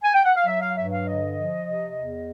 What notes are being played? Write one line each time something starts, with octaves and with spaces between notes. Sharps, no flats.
G#5
G5
F#5
F5
F#3 E5
F5
G2 E5
F5
D3 D#5
F3
C3
E2